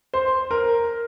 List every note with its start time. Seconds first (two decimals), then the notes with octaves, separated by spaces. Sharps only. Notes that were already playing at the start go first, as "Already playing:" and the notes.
0.14 C5
0.51 A#4